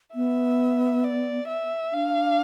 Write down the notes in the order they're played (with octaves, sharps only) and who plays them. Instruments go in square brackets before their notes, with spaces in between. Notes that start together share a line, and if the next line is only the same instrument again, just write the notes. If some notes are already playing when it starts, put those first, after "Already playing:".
[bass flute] B3 [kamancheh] E5
[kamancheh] D5
E5
[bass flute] D4 [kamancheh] F5